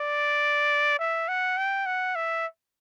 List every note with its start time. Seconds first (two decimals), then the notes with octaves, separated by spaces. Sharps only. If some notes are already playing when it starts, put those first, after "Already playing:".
Already playing: D5
0.99 E5
1.28 F#5
1.57 G5
1.86 F#5
2.16 E5